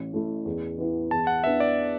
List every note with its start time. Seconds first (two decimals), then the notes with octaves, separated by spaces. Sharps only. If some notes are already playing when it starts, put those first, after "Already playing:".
Already playing: A1
0.13 A2 A3 E4
0.45 E2
0.78 E3 B3 E4
1.11 E2 A5
1.27 F#5
1.44 E3 B3 D4 E5
1.60 D5